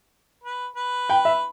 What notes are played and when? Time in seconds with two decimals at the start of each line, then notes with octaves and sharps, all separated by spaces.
0.44 B4
0.76 B4
1.09 G5
1.25 E5